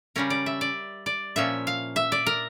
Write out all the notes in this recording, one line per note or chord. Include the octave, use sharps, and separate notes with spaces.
C#3 G3 C#4 A#4
D5
E5
D5
D5
A#2 F3 C#4 E5
F5
E5
D5
A#4